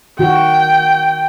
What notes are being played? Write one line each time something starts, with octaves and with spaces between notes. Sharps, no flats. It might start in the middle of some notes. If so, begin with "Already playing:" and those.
D#3 F#4 G5